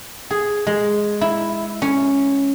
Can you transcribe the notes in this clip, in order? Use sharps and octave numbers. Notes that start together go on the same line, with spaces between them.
G#4
G#3
E4
C#4